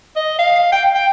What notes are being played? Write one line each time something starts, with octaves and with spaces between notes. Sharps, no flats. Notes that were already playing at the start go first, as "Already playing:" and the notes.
D#5
F5
G5
G5